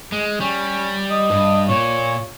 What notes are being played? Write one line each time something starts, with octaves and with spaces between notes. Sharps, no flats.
G#3
G3 C#4
D#5
G2
A#2 C#5